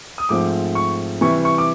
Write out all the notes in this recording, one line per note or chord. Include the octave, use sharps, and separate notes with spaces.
D#6
G#2 F3 A3 C4 D6
C#6
C3 E3 G3 C#6
C#6
D6